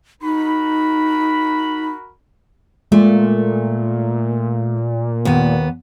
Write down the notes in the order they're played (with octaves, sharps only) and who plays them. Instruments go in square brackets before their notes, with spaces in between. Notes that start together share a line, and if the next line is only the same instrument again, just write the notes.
[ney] D#4 [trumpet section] F#4 A#4 B5
[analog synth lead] A#2 [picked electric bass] G#3 [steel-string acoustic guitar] A3
[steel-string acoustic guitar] D#2 B3